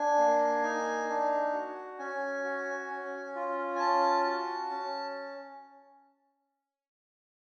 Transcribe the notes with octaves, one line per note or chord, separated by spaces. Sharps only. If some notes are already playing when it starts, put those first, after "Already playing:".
Already playing: D4 G#5
A#3
D#4
D4
F#4
C#4 G#5
F#4
C#4
F4
G#5
C#4 A5
F#4
C#4